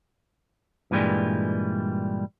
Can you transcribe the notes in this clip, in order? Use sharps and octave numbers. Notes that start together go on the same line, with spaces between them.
G2 A#2 E3 F3 G3 G#3